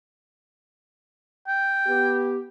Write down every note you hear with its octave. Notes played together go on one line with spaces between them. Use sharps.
G5
B3 G4